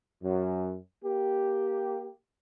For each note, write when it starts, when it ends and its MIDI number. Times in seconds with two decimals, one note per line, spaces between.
0.24 0.77 42
1.04 2.11 58
1.04 2.11 67